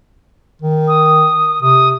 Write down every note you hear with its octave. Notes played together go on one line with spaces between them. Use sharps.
D#3
D#6
C3 D#6